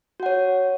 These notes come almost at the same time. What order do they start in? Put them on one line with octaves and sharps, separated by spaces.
F#4 F#5 C#5